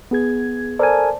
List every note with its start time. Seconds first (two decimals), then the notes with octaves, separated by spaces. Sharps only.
0.11 B3 G#4 G#6
0.79 A4 A#4 C5 D5 G#5 A5